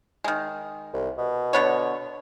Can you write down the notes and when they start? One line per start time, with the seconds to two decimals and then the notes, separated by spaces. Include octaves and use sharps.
0.24 D#3 G#3
0.94 C2
1.18 B2
1.53 D3 B3 C#5